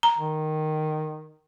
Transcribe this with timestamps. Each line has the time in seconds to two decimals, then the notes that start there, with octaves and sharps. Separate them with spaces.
0.03 A#5
0.18 D#3